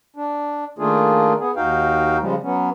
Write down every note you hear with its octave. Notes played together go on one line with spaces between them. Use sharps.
D4
D#3 A3 A#3 D4 F4 G#4
B3 G#4
D#2 D#4 F#4 F5 G5
C#3 F3 G3 G#3
F#3 B3 C#4